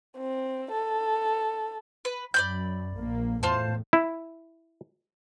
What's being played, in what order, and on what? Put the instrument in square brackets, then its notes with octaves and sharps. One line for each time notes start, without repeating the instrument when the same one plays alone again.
[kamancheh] C4
A4
[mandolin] B4
[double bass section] F#2 [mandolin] D5 B5 G6
[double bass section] A#1 A#3
[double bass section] E2 A2 [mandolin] F4 C5 A5
[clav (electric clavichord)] E4